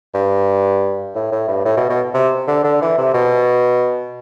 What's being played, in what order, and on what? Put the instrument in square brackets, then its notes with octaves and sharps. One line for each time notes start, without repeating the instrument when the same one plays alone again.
[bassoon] G2
A2
A2
G2
A2
B2
B2
C3
D3
D3
E3
C3
B2